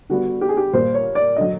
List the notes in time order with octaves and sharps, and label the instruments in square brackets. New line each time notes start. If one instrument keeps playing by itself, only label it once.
[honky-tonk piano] D3 G3 B3 [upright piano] F#4
[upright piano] G4
G#4
G4
[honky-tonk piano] A#2 G3 A#3 [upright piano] C5
[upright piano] C#5
D5
[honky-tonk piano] D3 F#3 [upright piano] D#5